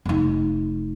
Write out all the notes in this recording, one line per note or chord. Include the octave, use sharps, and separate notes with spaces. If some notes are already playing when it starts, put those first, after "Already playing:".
F1 D#4